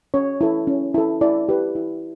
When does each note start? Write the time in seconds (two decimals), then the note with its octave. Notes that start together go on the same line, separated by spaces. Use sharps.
0.14 C#4 C#5
0.41 E4 A4
0.67 C#4
0.94 E4 A4
1.21 E4 D5
1.49 G4 B4
1.75 E4